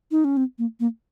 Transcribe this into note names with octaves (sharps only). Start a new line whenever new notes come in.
D#4
C#4
C4
A#3
A#3